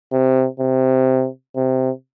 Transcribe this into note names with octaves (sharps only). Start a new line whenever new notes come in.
C3
C3
C3